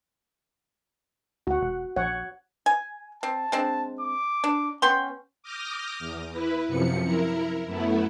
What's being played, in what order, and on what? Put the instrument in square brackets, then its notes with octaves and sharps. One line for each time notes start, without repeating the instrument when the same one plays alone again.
[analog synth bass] D2 [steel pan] F#4 F#5
[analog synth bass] E1
[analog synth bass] A#1 [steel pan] C#5 F#5
[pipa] G#5
[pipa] C4 [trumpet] A5
[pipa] G#3 C4 D4
[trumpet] D6
[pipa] D4
[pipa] B3 G5 C6 [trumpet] C#4
[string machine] D6 D#6 F6 G6 A#6
E2
E4 B4
F#2 C3 F3 C#7
E4 A#4
F#2 A3 B3 E4